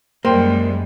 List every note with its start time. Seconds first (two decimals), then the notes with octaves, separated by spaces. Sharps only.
0.25 F#2 G3 G#3 A#3 C5 G5 C6